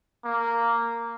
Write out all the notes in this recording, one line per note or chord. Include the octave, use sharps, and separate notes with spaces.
A#3